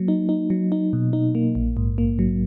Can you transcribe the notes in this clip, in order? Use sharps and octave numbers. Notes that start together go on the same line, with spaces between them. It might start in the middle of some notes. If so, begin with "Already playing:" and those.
Already playing: F#3 A#3
D#4
D#4
F#3
D#4
B2
D#4
A#3
A#1
G#2
A#3
F#3